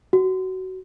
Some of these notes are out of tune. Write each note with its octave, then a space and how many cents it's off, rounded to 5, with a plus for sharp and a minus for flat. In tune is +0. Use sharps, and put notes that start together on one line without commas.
F#4 +20